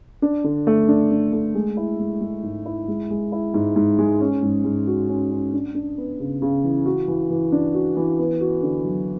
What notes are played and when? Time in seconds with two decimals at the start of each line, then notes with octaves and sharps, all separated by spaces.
0.22 D4
0.44 D3
0.67 A3
0.88 D4
1.11 D4
1.33 A3
1.55 G#3
1.77 E4
1.99 G#3
2.21 G#3
2.43 G#2
2.66 E4
2.88 G#3
3.10 G#3
3.32 E4
3.54 G#2
3.76 G#2
3.99 G#3
4.21 C#4
4.43 G#2
4.65 G#2
4.87 F#4
5.09 C#4
5.31 C#4
5.53 D4
5.75 D4
5.98 B3
6.20 C#3
6.42 C#3
6.64 E3
6.86 F#4
7.08 E3
7.30 E3
7.52 D4
7.74 F#4
7.97 E3
8.19 B3
8.41 F#4
8.63 D3
8.85 F#3